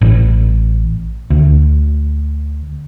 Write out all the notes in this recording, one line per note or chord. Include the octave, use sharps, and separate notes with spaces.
A1
D2